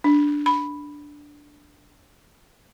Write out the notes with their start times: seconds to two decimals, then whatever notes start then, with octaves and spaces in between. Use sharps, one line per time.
0.04 D4
0.46 B5